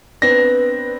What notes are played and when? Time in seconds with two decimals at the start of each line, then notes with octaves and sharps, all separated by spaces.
0.22 B3 C4 D4 B4 A#6